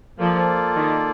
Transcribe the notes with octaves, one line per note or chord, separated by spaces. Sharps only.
F3 A#3 F4 A4 D5
D#3